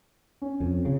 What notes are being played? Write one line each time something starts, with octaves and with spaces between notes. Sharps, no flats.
C#4
F2
C#3